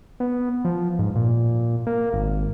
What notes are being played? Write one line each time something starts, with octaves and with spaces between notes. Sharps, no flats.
B3
F3
G#2
A#2
A#3
G#1